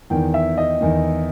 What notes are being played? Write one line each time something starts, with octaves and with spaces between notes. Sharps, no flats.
E2 D#3 G5
E5
D#5
E2 D#3